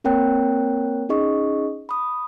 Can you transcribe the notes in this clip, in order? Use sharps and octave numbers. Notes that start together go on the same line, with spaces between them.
A#3 C4 A#4 C#5 G5 F#6
C#4 D#4 G#4 D#5 C#6
B5 D#6